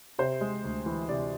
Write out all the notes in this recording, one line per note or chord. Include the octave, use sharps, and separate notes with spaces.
C3 C5
G#3
D2
E3
C3 D5